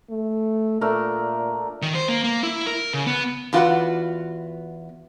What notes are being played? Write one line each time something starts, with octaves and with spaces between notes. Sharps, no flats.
A3
A#2 A3 D4 A#4
D#3
C5
A#3
A#3
E4
A#4
C#3
B3
E2 F4 F#4 B4 F#5